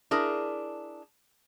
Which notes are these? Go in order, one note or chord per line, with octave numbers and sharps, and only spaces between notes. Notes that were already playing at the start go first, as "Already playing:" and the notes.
D4 E4 G#4 A#4